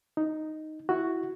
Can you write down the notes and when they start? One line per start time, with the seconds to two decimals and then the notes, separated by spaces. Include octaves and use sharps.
0.17 D#4
0.89 E4 F#4